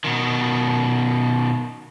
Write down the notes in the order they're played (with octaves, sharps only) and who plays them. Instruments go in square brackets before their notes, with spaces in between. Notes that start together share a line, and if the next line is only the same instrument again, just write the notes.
[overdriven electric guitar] B2 D#3